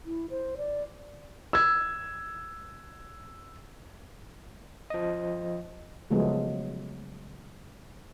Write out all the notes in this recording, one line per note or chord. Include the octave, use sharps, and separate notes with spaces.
E4
C5
D5
E6 G#6
F3 D#5
C#3 F3 F#3 G#3 A3 B3